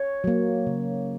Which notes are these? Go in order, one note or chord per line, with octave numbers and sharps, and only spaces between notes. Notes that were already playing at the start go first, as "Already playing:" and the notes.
Already playing: C#5
F#3 A#3
C#3